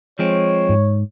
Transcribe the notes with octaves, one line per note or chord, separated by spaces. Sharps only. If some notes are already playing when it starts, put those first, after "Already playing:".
F3 G#3 C4 C#5
G#2